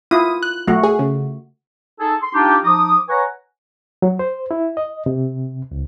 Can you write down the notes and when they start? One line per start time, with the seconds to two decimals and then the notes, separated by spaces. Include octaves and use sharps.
0.11 E4 F4 D#6
0.43 F#6
0.67 B1 A3 F#4
0.83 G#4
0.99 C#3
2.00 D#4 G#4 A4
2.23 C6
2.34 D4 D#4 F4 G4
2.64 F3 D#4 D6 D#6
3.09 B4 C#5 F#5 G#5 A#5 C#6
4.02 F#3
4.19 C5
4.51 E4
4.77 D#5
5.06 C3
5.71 C#2